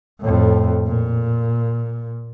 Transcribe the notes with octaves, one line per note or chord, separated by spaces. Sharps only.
F2 A2
A#2